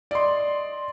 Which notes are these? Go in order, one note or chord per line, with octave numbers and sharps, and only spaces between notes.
D5 D#5 C6